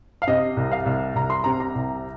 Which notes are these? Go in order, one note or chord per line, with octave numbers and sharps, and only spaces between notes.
F5
C3 D#5
C2
F5
C2
C2 A#5
C6
C3 A#5
A#5
C2